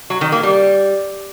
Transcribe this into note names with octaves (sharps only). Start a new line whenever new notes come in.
F#3
D#3
A#3
G3